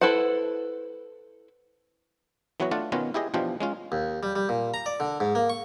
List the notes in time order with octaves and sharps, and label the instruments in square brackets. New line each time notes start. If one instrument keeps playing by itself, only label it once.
[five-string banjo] E4 A4 B4 C5 F#5
[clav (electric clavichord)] E3 F#3 B3 F#4 C#5
A3 D4 F4 F#5 A5
B2 D#3 B3 C#4 F4 F#4
E4 G4 G#4 D#5
B2 E3 F3 D4 F4 G4
G#3 C#4 F4
[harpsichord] D#2
G3
G3
A#2
A#5
D5
D3
G#2
A#3
C#6